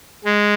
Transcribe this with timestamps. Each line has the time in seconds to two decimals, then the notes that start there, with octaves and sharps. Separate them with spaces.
0.25 G#3